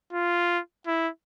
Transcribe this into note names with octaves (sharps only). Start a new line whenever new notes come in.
F4
E4